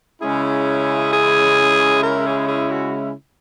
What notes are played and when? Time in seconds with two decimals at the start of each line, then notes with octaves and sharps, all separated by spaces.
0.21 C#3 G#3 C#4 E4 G#4
1.13 G#4
2.03 A#4
2.26 G#4
2.48 G#4
2.72 F#4